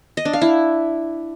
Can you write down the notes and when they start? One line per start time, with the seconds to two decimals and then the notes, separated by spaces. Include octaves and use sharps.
0.17 D#5
0.25 D4
0.33 F5
0.41 E4